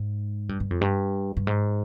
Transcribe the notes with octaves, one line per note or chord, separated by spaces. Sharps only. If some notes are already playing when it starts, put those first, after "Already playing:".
Already playing: G#2
G2
G2
F2
G2
G2
G#2